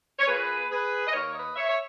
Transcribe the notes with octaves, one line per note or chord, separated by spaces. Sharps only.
C#5
A#2 A#3 G#4 B4
G#4 B4
D#5
D#2 D#3 A#3 A#4 C#5
B4 D#5
C#5 E5
C#5